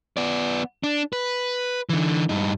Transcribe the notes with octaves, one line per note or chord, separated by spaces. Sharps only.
B3 D5
D4
B4
D3 E3
G2 D#4